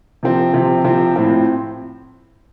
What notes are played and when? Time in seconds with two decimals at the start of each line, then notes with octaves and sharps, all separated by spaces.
0.23 C3 F3 C4
0.54 C3 F3 C4
0.84 C3 F3 C4
1.16 A2 F3 C4